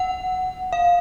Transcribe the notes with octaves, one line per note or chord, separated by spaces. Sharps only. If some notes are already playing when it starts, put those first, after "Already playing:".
Already playing: F#5
F5